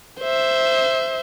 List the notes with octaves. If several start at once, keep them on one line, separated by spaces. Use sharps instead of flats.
C5 E5